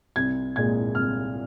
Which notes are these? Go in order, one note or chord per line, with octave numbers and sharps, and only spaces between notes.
C2 G#6
A#2 G#3 G#6
C2 F6